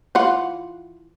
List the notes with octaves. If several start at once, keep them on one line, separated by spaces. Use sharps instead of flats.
E3 F4 F#5